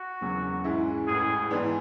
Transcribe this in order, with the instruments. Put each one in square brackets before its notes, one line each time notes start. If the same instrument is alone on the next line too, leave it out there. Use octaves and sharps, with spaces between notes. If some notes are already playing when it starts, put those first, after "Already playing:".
Already playing: [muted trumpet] F#4
[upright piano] E1 E2 C#3 F#3
G#2 E3 G#3 C#4 E4
[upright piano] A1 A2 G#3 [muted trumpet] G#4
[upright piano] G#2 E3 B3 D4 G#4